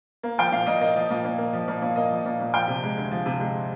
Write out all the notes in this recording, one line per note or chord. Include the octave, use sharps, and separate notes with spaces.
A#3
F3 G5
A#2 F5
A#2 D#5
A#3 D#5
F3
A#2
A#2
A#3
F3
A#2
A#2
A#3 D#5
F3
A#2
A#2
F3 G5
C3
G#3
D2
F3
C3
G#3